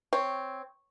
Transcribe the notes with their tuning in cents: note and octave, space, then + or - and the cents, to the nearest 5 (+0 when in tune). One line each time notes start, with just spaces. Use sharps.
C4 +0 C#5 +0